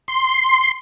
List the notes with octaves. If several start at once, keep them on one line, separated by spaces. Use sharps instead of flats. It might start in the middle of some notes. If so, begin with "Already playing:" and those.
C6